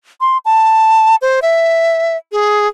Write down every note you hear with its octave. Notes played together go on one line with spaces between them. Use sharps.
C6
A5
C5
E5
G#4